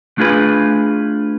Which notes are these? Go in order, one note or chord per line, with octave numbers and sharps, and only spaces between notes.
A3 D4 F4 G#4 B4